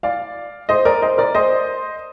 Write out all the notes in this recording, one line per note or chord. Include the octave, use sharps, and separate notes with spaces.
D5 F5
C5 D#5
A#4 D5
C5 D#5
A#4 D5
C5 D#5